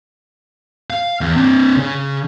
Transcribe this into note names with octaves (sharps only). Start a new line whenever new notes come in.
F5
E2
C4 D4
C#3